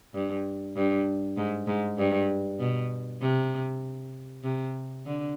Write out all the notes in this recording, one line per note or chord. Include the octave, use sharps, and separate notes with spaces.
G2
G2
G#2
G#2
G2
B2
C3
C3
D3